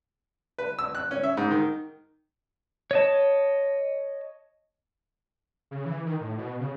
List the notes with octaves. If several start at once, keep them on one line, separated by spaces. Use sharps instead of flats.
B4
E6
F#6
C#4
E5
G#2
D#3
C#5 D#5 A5
C#3
E3
D#3
A2
B2
C#3